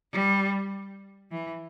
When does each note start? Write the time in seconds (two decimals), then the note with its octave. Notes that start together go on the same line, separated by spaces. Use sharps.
0.12 G3
1.31 E3